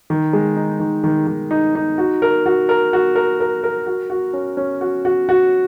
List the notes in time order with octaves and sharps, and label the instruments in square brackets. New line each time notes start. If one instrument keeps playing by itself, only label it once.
[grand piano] D#3
G#3
D#4
D#3
D#3
D#3
D#4
D#4
F#4
A#4
F#4
A#4
F#4
A#4
A#4
A#4
F#4
F#4
C#4
C#4
F#4
F#4
F#4